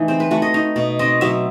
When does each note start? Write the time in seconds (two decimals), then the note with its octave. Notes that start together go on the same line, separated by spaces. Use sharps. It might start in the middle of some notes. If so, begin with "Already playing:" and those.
Already playing: E3 A3 D#4
0.08 C4 C5
0.20 B4
0.31 A3 F#4
0.42 D#5
0.54 D#4
0.76 B2
0.99 C4 D#5
1.21 F#3 E5